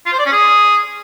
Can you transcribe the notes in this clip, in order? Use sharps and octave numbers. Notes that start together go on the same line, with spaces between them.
F4
C5
D5
C#4
G#4